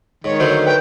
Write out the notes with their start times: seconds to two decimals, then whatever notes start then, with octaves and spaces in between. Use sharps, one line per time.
0.24 G#2 D#3 C#5
0.40 D3 F#3 A3 C5
0.66 B4 G5